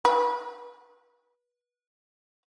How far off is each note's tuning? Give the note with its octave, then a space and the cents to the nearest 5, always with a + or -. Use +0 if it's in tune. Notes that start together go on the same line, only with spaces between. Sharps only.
B4 -25